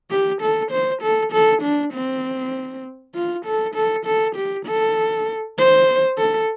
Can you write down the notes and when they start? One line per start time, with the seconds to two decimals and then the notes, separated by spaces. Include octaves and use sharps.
0.11 G4
0.41 A4
0.71 C5
1.02 A4
1.33 A4
1.63 D4
1.93 C4
3.15 F4
3.46 A4
3.75 A4
4.06 A4
4.36 G4
4.67 A4
5.58 C5
6.18 A4